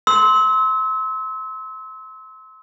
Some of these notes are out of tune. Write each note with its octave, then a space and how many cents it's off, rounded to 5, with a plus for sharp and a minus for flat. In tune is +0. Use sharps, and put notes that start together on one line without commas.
C6 +0 E6 -35